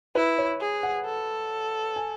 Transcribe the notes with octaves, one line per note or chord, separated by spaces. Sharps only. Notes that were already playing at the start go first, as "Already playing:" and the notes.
E4 B4
C#5
G#4
F#5
A4
G#5